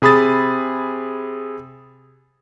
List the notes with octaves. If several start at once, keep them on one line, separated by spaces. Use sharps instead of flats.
C3 G#4 B5 D#6 A6